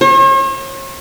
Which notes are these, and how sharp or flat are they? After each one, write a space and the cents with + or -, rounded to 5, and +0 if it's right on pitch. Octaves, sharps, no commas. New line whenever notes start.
C#5 -45